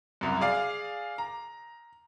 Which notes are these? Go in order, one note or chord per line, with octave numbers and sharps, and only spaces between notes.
C2 F#2
G#4 D5 F5
A#5